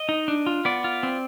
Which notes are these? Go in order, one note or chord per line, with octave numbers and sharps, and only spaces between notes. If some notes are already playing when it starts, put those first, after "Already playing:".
Already playing: D#5
D#4
D4
F4
B3 D5
F4
C4